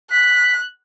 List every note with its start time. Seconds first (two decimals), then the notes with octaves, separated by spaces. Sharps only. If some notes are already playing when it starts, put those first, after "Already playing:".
0.11 F#6 B6